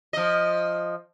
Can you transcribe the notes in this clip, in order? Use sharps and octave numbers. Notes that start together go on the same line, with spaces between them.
F3 D#5